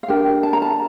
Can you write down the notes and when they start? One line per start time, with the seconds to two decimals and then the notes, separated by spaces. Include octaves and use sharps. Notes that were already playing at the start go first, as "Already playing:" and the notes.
0.03 F5
0.08 D4 G4 A#4 G5
0.43 A5
0.53 A#5
0.62 A5